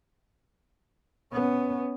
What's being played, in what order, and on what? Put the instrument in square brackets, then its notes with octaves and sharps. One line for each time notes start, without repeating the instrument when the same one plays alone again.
[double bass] B3 C#4